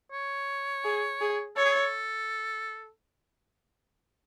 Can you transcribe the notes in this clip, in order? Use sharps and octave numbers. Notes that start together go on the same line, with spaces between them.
C#5
G#4
G#4
A4 C#5
G#4
A4